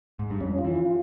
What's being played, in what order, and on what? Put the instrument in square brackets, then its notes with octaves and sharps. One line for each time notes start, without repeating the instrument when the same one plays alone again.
[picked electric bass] G#2
G2
[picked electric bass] F2 [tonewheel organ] C#4
[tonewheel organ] F4
[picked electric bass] E3
[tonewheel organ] F4